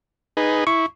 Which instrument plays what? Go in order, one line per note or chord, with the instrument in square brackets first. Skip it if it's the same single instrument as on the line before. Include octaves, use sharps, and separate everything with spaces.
[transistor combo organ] D#4 G#4 B4
[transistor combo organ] E4 [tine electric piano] C#6